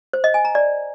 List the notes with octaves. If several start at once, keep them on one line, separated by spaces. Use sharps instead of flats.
C5
D#5
G#5
A#5
D5